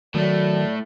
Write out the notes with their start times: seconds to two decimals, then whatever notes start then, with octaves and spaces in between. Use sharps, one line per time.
0.14 A2 D#3 F#3 A3 D5